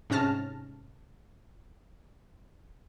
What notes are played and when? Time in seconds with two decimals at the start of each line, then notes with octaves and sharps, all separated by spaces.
0.10 G#2 C3 C#4 A5 F6 A#6